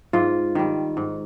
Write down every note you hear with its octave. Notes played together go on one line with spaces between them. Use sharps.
G#2 F4
D#3 G3
G#2